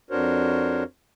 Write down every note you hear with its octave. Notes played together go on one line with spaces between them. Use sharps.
F2 D4 F#4 A#4 C5 C#5